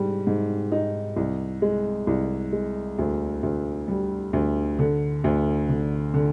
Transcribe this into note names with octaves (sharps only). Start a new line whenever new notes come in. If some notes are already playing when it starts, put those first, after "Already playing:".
Already playing: G#2 G3
G#2
D#4
C2
G#3
C2
G#3
D2
D2
G3
D2
D3
D2
D3
D3